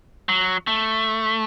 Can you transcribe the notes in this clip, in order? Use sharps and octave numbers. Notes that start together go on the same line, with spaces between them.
F#3
A3